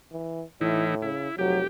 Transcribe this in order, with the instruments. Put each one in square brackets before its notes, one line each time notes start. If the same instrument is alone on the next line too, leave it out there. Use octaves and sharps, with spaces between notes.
[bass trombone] E3
[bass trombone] A2 [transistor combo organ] E3 D#4 E4
[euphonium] C#3 [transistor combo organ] E4
[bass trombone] F1 [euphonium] F#3 [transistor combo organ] G4